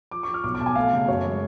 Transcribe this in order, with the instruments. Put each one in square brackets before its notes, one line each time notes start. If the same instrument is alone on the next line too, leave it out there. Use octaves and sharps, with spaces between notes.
[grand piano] F3 D6
F3 C#6
F6
B1 D6
D6
B1 A5
G#5
A3 F5
C#3
F#2 C#5
G#3